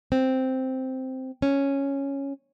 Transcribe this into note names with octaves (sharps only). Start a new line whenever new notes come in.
C4
C#4